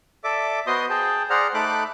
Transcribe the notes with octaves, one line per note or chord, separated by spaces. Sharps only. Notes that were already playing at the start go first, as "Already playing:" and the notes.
A4 D5 E5 D6
B3 F#4 C5 D#5 C6 D#6
G#4 G5 A5
G#4 C5 D5 F#5 A#5 F6
A3 D#4 A4 B5 D6 F#6